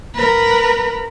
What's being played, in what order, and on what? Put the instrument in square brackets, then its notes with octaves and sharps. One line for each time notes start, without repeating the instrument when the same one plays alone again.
[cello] A#4 B4